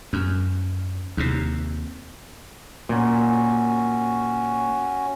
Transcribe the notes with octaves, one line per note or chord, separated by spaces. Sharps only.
F#2
D#2 C3
A#2 C#4 F#4